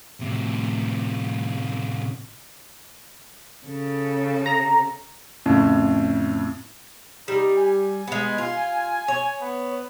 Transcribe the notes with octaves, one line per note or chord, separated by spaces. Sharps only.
A2 C3
C#3 A4
A#5
F2 A2 C#3
G3 D#4
G#5
G#3 B3
F4
C#5
B3